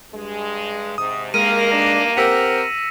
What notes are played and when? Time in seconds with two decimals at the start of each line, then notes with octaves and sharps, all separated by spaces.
0.12 G2 G#3
0.98 G#2 C3 D#6
1.34 G2 D#3 G#3 A#3 A#4 D#7
1.72 D4 A#6 E7
2.17 C4 G4 A#4 F#5 E6 B6 C#7